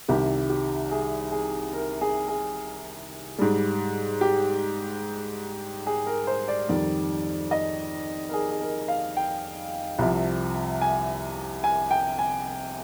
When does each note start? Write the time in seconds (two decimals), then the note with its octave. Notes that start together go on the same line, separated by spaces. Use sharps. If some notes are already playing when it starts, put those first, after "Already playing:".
0.08 C2 C3 D#3 G3 G4
0.50 G4
0.91 G#4
1.32 G#4
1.73 A#4
2.01 G#4
2.28 G#4
3.39 G#2 G3
4.21 G4
5.87 G#4
6.07 A#4
6.27 C5
6.48 D5
6.69 F2 D#3 G3
7.51 D#5
8.29 A#4
8.33 G#4
8.51 G#4
8.61 A#4
8.88 F5
9.17 G5
9.99 C2 C3 F3
10.81 G#5
11.64 G#5
11.91 G5
12.19 G#5